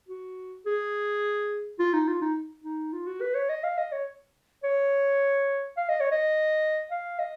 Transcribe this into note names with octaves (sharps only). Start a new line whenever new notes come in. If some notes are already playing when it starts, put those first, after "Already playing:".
F#4
G#4
F4
D#4
F4
D#4
D#4
F4
F#4
B4
C#5
D#5
F5
D#5
C#5
C#5
F5
D#5
C#5
D#5
F5
D#5